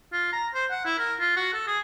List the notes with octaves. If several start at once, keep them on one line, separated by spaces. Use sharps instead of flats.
F4
A#5
C5
F#5
E4
A#4
F4
F#4
A4
G#4